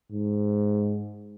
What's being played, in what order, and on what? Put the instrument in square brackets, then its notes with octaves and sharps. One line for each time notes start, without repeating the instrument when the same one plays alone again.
[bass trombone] G#2